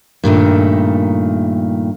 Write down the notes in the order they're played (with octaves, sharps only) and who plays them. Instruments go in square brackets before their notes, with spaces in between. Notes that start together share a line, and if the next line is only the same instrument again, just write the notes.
[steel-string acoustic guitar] G2 A#2 D#3 A3